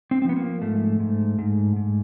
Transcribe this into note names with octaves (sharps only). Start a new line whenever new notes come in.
C4
C4
F3 B3
A#3
G#2 A3
G#2
G#2
G#2